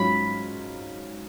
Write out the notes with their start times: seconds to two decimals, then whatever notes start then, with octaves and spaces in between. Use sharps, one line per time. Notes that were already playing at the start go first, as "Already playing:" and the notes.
Already playing: G#2 F#3 C#4 F4 B5